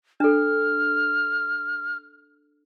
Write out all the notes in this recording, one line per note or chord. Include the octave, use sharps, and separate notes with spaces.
D4 A4 F6